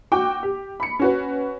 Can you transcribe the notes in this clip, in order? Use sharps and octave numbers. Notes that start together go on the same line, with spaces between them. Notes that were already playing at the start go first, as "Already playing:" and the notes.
F#4 G5 D6
G4
B5 C#7
C#4 F#4 B4